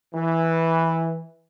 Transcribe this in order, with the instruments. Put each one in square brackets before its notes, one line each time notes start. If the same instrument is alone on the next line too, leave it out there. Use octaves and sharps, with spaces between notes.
[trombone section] E3